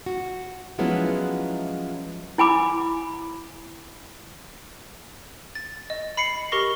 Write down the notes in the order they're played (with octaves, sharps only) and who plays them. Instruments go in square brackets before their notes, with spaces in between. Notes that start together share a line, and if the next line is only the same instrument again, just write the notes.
[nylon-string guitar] F#4
F3 F#3 G#3 B3 C#4 E4
[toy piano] E4 G#5 B5 D6
[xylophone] A6
D#5
B5 C7 C#7
G4 A#4 C#6 A#6